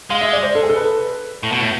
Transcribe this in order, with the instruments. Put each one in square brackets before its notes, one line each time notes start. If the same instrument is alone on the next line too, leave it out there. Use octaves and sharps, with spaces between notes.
[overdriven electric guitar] G#3 [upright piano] F5
[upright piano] E5
D5
C5
A4
G#4
A4
B4
[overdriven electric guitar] A2
B2
A2